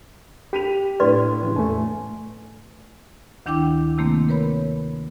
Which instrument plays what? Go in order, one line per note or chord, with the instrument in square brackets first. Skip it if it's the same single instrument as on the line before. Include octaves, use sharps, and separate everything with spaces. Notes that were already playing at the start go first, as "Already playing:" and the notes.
[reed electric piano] G4 [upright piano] B6 D#7 F7
[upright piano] A#1 A2 [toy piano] B4 D5 C6
[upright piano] C#3 E3
[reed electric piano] E2 A2 A3 [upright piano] G#5
[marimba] D2 D#3 D4 E4 G5 D6
C3 D#3 A3 A#3 C4
A#4 B4 C#5 B5